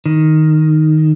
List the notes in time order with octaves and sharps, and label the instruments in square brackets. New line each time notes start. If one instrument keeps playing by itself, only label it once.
[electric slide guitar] D#3